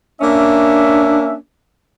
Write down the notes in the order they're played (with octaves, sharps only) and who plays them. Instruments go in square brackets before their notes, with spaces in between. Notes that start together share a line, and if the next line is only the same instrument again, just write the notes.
[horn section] A#3 C#4 E5 [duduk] D4